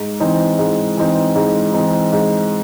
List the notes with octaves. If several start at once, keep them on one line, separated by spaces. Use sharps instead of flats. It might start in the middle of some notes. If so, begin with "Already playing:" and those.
Already playing: G#2
E3 C4 D#4
G#2
E3 C4 D#4
G#2
E3 C4 D#4
G#2